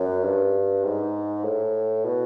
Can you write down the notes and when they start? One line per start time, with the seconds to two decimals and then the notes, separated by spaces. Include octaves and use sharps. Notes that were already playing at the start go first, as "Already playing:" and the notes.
Already playing: F#2
0.24 G2
0.84 G#2
1.44 A2
2.05 B2